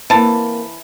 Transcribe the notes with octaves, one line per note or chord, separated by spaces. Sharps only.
E3 A#3 C4 A5